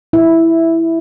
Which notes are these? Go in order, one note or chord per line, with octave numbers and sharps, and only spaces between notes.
E4